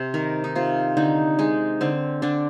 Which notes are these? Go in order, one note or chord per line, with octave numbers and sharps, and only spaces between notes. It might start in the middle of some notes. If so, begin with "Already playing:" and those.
Already playing: C3 C5
D#3 A#4
D#4
C3 F4
D3 D#4
G#3 D#4
D3 C4
D3 D4